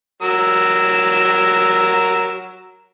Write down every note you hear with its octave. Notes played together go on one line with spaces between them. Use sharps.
F#3 A#4 E6